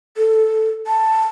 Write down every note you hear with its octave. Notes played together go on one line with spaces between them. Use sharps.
A4
A5